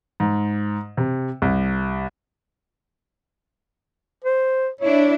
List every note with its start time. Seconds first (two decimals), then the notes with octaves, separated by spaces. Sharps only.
0.20 G#2
0.97 C3
1.42 C2
4.24 C5
4.81 D4 E4 C#5